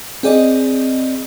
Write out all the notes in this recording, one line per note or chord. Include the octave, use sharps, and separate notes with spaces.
C4 G#4 D5 D#5